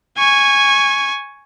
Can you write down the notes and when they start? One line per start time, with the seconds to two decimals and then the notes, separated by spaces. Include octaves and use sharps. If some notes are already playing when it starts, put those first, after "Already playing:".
0.18 G#5 C#6